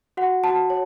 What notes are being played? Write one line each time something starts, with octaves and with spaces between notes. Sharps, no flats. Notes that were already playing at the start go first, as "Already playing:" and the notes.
F#4 F#5
F#4 A5
C#5